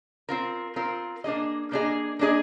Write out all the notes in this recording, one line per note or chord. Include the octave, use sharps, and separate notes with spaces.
C4 F4 A#4
C4 F4 A#4
A#3 D4 G#4 D#5
A#3 D4 G#4 D#5
A#3 D4 G#4 D#5